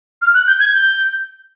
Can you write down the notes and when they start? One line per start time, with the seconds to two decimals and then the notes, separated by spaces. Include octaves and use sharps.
0.22 F6
0.34 F#6
0.47 G6
0.60 G#6
0.73 G6